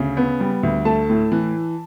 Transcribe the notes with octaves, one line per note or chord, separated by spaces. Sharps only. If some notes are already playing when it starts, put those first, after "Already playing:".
Already playing: D2 C#3
B3
G3
D2
A3 A5
A2
E3